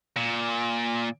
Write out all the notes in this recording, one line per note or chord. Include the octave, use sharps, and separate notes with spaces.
A#2